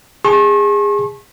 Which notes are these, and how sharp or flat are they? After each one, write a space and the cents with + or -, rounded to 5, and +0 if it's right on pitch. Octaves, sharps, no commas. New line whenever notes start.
G#4 -25 A5 -35 C#6 -40